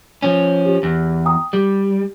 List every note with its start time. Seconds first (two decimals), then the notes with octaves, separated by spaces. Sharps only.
0.22 F3 C#4
0.65 G4
0.83 E2
1.25 G5 A#5 D#6
1.53 G3 G4